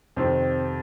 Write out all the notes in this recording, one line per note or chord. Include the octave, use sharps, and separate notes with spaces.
F2 C3 D#3 C4 C5